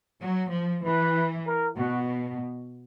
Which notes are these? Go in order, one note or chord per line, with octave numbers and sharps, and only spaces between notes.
F#3
F3
E3 B4
A#4
B2 F#4